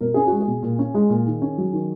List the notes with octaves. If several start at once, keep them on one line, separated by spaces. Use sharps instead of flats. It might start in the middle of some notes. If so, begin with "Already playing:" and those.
B2 A#4
C#4 G#4
F#4
G#3
G#4
B2
A#2
C#4
G#3
A#2
D#3
C#4
F#3
D#3